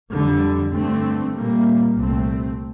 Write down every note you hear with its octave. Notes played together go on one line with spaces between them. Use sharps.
F2 D3 G3
G2 D3 A3 C4
A#2 G3 A#3
C2 A#2 A3 C4